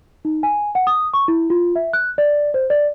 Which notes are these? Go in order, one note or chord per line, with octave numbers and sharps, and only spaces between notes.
D#4
G#5
F#5
D#6
C#6
E4
F4
E5
F#6
D5
C5
D5